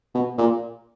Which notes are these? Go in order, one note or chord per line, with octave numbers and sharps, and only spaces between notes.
B2
A#2